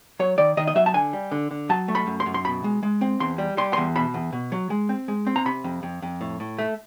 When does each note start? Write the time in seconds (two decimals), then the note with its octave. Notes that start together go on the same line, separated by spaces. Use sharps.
0.19 F#3 C#5
0.38 D#3 D5
0.57 D#3 D#5
0.67 D#5
0.75 F#3 E5
0.86 A5
0.94 D3 G#5
1.13 G3
1.31 D3
1.51 D3
1.69 F#3 A5
1.88 A3
1.95 B5
2.07 F#2
2.20 C6
2.26 F#2
2.34 C6
2.45 B2 B5
2.64 G#3
2.83 G#3
3.01 C4
3.20 E2 C6
3.38 G3
3.57 G3 C6
3.73 E2 C6
3.95 B2 B5
4.14 E2
4.33 B2
4.52 F#3
4.70 G#3
4.89 C4
5.08 G#3
5.27 C4
5.36 A#5
5.45 C3 B5
5.64 F2
5.83 F2
6.02 F2
6.21 A2
6.40 A2
6.58 A3